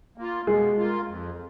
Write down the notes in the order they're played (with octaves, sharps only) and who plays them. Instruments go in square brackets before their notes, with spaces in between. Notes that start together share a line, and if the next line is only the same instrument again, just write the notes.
[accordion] A#3 F4
[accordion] B2 [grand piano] G#3 G#4
[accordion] A#3 F4
F2